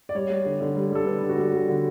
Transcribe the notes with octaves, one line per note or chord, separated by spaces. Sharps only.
D5
G3 C#5
G3
D3
D3
G3
G3 A4
D3 B4
D3
F#4
G3
G3
D3